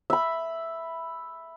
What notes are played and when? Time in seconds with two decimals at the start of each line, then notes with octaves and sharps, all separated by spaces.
0.10 E5 B5